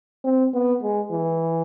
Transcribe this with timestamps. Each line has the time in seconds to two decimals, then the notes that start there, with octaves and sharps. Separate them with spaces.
0.24 C4
0.53 B3
0.82 G#3
1.12 E3